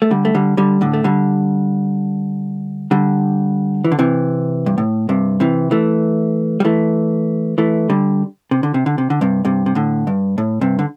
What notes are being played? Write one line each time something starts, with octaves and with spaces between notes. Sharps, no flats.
A3
D3 G3
A3
D3 G3
D3 G3
A2 D3
A3
D3 G3
D3 G3
E3
D3
C3 E3
G2
A2
G2 C3
C3 E3
E3 A3
G3
E3 A3
E3 A3
D3 G3
C3
D3
C3
D3
C3
D3
G2 C3
G2 C3
C3
A2 D3
G2
A2
G2 C3
D3